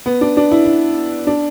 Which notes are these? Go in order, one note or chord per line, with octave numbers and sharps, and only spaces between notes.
B3
D4
D4
E4
E4
D4